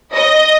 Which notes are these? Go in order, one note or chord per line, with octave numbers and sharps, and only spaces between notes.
D#5